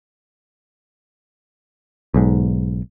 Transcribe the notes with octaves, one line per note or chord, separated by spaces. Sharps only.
B1 G#2